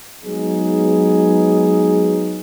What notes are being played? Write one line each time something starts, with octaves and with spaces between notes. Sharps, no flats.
F#3 G#3 B3 D#4 G#4